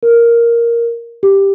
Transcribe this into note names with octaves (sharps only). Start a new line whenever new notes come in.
A#4
G4